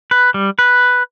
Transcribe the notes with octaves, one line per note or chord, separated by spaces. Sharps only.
B4
G3
B4